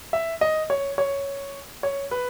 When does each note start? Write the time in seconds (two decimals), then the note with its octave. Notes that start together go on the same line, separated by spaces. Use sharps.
0.13 E5
0.41 D#5
0.70 C#5
0.98 C#5
1.83 C#5
2.11 B4